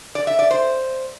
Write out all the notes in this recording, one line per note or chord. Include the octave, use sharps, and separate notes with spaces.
D5
E5
D5
C5